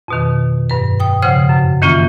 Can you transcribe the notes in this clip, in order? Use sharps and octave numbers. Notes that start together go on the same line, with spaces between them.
F2 B2 D#3
G2 B4
G5 D#6
C#3 F3 C5 F#5 D#6 F6
F#2
D#3 E3 A#3 C#4 F4